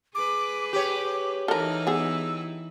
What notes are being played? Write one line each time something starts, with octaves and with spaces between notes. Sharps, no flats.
G#4 B4 D6
G4 C#5 D6
E3 D#4 E4 A4 A#4 F6
B3 G#4 E6